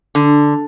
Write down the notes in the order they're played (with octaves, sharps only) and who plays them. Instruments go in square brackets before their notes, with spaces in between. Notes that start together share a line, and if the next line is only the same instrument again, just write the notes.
[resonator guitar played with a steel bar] D3